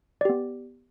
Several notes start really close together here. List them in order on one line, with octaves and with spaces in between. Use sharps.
D5 G4 B3